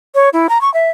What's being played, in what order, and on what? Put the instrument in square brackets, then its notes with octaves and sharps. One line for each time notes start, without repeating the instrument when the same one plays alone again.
[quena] C#5
E4
A#5
C#6
E5